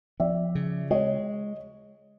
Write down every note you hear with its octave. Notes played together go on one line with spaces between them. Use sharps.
F3 D5 E5
C#3
G#3 C#5 D#5